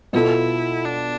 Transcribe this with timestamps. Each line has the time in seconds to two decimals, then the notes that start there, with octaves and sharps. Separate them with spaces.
0.13 B2 B3 E4 F4 A4
0.84 D4